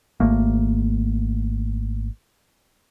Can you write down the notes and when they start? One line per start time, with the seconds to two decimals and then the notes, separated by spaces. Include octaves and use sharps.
0.20 G#1 A3 A#3